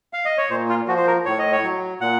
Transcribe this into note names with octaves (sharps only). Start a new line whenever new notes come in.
F5
D#5
C#5
A#2 C5
F4
F3 F#4
C5
A#4
A2 C#5
D#5
C#5
F#3
A#2 F#5